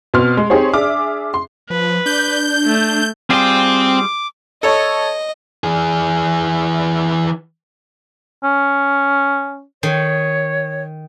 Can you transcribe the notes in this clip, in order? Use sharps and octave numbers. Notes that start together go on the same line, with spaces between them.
B2 C4 C6 F6
G#3
C4 D#4 G4 G#4 C5 C#5
D4 G#4 E5 D6 F6
C6
F3 B4
D4 G6
A3
G3 C4 F4 G#4 G5 D6
A4 C#5 D#5
E3 G#4
C#4
D#3 C#5